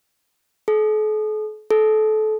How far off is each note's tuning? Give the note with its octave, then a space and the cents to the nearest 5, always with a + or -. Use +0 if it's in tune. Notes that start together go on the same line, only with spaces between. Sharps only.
A4 -45
A4 -25